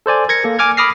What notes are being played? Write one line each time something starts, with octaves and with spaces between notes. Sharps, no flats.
A4 C5 D5 G#5
A#4 G#6 A#6 C#7
A#3 A4
G#5 D6 F6 G#6
B5 D6 D#6 F6 A#6 C7